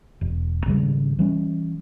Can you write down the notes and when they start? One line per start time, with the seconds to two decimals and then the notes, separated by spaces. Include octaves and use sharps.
0.21 E1
0.66 G#1 C#3 G3
1.19 E3 G3 C#4